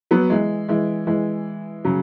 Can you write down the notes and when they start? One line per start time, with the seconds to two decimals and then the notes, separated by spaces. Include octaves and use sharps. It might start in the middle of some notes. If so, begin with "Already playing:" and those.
0.11 F#3 B3
0.30 E3 G#3
0.69 E3 G#3
1.07 E3 G#3
1.85 C#3 F#3